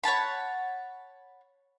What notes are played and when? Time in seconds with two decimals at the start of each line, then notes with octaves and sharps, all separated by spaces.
0.03 C#5 F#5 A5 B5